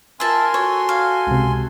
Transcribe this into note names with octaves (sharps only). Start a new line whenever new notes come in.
F4 A#4 E5 G#5 A5 C6
F#4 A4 C#5
F5
C#2 C3